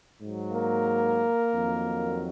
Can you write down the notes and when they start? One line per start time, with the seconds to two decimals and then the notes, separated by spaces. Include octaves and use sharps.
0.20 G#2 F#3
0.53 A#3 A#4
1.54 F2 D#3 F#3